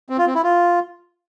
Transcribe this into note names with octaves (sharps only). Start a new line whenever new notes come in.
C4
F4
C4
E4
F4